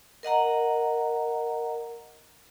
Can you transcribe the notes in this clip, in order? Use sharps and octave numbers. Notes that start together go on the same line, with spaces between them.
A#4 D#5 F#5 A#5